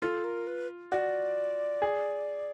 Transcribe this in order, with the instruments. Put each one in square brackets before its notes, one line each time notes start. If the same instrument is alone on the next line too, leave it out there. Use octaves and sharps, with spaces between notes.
[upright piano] F4 [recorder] A4
[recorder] A#4
B4
[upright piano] F#4 [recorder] D5
[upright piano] G#4